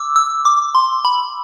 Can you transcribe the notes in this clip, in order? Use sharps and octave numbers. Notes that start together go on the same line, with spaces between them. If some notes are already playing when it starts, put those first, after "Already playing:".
Already playing: D6 E6
E6
D6
C6
B5